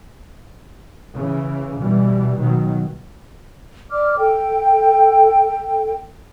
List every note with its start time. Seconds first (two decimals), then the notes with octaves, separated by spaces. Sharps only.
1.15 C#3 E3
1.80 B2 E3 G3
2.39 B2 D#3 F#3
3.91 D5 D6 F6
4.18 A4 G5